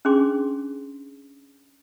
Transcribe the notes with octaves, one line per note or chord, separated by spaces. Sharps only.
C#4 D4 G#4 C6 D6